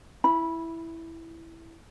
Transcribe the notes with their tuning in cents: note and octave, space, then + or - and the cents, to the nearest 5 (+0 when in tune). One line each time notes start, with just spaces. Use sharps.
E4 +0 B5 -15